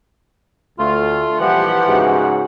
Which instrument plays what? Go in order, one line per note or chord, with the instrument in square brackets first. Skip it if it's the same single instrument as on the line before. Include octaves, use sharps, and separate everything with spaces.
[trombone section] D2 [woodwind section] A3 F4
[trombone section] A#1 G3 [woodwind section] E3 F3 [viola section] G4 F#5
[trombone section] G#2 C#3 F#4